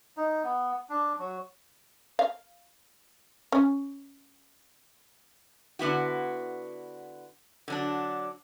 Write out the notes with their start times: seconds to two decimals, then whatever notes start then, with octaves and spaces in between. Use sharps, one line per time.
0.17 D#4
0.44 B3
0.90 D4
1.19 F#3
2.19 F5
3.52 C#4
5.79 D3 B3 E4 F#4
7.68 D3 F#3 D4